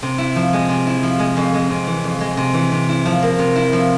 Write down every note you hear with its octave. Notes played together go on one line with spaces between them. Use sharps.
C3
E4
F3
G#3
C3
E4
F3
G#3
F2
G#3
C3
E3
F2
G#3
C3
E3
C3
E4
F3
A#3
C3
E4
F3